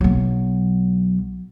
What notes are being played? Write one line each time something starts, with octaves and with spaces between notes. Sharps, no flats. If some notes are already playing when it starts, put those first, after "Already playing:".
B1 F#3